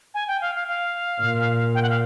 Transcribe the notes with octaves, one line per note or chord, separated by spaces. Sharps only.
G#5
G5
F5
F5
F5
A#2
G5
F#5
F5